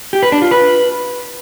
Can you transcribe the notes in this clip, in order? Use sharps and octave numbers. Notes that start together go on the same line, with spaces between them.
G4
B4
D4
F4
B4